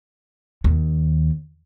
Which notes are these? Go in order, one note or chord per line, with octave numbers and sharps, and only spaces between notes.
D#2